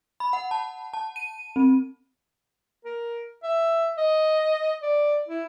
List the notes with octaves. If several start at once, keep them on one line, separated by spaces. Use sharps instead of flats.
B5
F#5
A5
A5
D#7
C4
A#4
E5
D#5
D5
E4